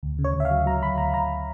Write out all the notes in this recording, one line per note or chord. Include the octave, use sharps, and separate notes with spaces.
D2
C#3
C#5
D2
E5
F5
F#3
F#3 A#5
D2 B5
D2 A#5
D2 A#5